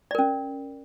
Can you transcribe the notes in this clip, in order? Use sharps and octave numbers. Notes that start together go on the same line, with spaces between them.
C#4 A#4 D5